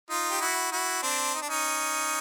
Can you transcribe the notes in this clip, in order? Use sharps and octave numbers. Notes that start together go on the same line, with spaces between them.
D#4 F4
G4
E4 F#4
E4 F#4
C4 D4
D#4
D4
C#4 D#4